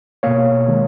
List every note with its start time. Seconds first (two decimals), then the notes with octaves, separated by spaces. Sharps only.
0.23 B2 A#3 C#5 F5
0.68 D#3 G#3